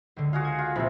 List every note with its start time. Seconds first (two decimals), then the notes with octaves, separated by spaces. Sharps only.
0.16 C#2 D3
0.33 F4 F#4 G#4 F5
0.44 G#6
0.58 F4
0.76 A#1 C3 C4 E4 B5